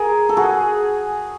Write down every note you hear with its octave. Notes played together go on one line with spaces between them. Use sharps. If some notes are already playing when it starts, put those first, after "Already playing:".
Already playing: G#4 A#4
A4
F#4 G#4